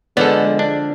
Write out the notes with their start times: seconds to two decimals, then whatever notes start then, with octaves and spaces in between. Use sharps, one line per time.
0.17 D3 F3 G#3 B3 A4 D5
0.59 D4